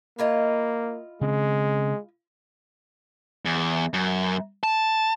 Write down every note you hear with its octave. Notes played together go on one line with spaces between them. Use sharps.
A#3 E4 F4 D#5
C#3 G#3 C4
E2
F#2
A5